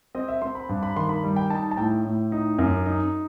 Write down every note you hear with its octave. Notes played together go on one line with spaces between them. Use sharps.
C4 D#5
E5
C4 C6
B5
G2
B5
D#3 C6
B5
G3
G5
D#4 A5
A5
A2 G5
A2
D#4
F#2
D#4